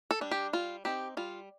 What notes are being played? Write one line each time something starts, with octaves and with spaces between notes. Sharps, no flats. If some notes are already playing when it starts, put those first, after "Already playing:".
A4
G3 D4
G4
G3 F4
C4 D#4 G4
G3 F4